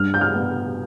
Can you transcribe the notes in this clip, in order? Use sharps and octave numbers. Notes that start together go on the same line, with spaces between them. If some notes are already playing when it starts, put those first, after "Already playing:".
Already playing: G2 F6
G6
F6
B3